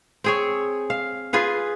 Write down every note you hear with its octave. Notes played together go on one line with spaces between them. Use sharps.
C4 G#4 C#5
F5
F4 G#4 B4 F5